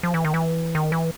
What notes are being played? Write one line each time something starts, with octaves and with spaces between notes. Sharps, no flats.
F3
E3
D#3
E3
D#3
E3